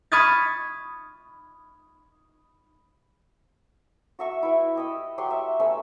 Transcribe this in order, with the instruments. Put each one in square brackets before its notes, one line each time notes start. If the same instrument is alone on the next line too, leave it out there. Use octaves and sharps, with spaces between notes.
[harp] B5 C#6 D#6 F6 G#6 A6
[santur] F#4 E5 C#6
E4 B4
G4 D#5 E6
F#3 G4 C6 C#6
E5
A3 C#4 B4 E6